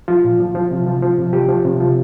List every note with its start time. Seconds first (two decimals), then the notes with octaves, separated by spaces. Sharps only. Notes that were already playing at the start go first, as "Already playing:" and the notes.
0.08 F3 F4
0.24 A#2
0.40 F3
0.55 F3
0.71 C3
0.87 F3
1.03 F3
1.18 C3
1.33 F3 G4
1.49 F3
1.65 C3
1.80 F3